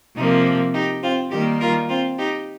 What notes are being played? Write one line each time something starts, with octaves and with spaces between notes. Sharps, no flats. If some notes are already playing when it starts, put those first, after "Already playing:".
C3 F3 A#3 D#4
D#4 G4
C4 F4
D#3 G3 A#3 D#4 G4
F4 A#4
C4 F4
D#4 G4